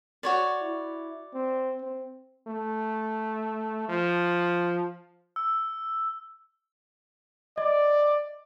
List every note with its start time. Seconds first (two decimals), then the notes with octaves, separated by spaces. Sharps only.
0.23 F#4 C#5 D5
0.62 E4
1.34 C4
1.82 C4
2.47 A3
3.89 F3
5.36 E6
7.58 D5 D#5